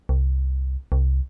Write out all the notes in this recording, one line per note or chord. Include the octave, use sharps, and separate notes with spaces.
C2
C2